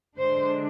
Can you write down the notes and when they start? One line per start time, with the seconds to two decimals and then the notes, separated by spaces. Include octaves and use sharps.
0.17 D3 G#3 D4 C5